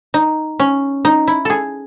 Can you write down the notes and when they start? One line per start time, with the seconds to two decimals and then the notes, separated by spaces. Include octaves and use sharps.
0.14 D#4
0.60 C#4
1.05 D#4
1.28 E4
1.45 G#4 A4